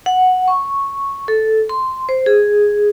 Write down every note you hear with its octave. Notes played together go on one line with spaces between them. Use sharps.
F#5
C#6
A4
C6
C5
G#4